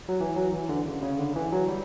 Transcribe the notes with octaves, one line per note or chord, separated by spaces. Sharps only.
F#3
E3
F#3
E3
D3
C#3
C#3
D3
E3
F#3
G3